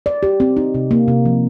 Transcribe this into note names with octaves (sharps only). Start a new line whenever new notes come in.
D5
G4
C4
D#4
C3
A#3
C3
F3